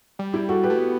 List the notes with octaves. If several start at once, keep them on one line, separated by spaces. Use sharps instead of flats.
G3
E4 G4
F#4 A4
G4 B4
A3
B3